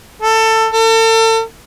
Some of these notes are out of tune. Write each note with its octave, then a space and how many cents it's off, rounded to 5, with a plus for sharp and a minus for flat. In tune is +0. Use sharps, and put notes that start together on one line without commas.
A4 +20
A4 +40